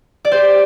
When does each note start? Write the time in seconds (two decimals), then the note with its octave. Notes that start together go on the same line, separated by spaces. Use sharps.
0.25 D5
0.32 G4 C5